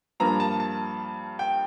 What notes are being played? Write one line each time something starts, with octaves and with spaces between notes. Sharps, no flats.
G2 F3 A#3 A#5
A5
A5
G5